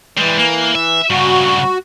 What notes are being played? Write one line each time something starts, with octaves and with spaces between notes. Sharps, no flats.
E3 G3 G#3
A#3
E5
G2 C#3 F#4